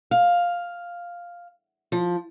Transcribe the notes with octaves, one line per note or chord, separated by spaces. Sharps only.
F5
F3